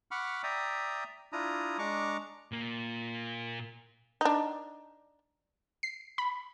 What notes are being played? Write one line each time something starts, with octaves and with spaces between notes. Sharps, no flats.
F#5 B5 C#6 D6 F6
D5 E5 G5 A#5 D#6
D4 E4 F4 A#5 D#6
G#3 D4 A#5 C#6 D6
A#2 A#3
D4 D#4
C7
B5